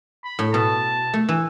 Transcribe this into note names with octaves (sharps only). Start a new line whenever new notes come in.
B5
A2
B2 A5
A3
E3